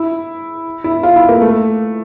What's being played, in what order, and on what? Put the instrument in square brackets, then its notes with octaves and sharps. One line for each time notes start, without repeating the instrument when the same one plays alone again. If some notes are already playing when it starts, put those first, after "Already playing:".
Already playing: [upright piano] E4
E4
F4
E4
A#3
A3